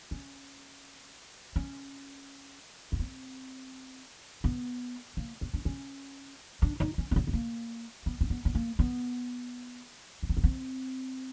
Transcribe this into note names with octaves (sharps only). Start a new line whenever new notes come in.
C#4
C#4
B3
C4
B3
A#3
B3
D4
C#4
D4
D#4
C#4
B3
C4
B3
A#3
B3
C4
B3
B3
A#3
B3
C#4
C4
B3
C4